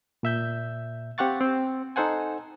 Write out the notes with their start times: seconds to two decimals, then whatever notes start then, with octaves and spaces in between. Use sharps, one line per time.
0.23 A#2 E5 G6
1.18 C4 G4 F5 F#5 C#6 A6
1.41 C4
1.96 D#4 A4 C5 F#5 G#5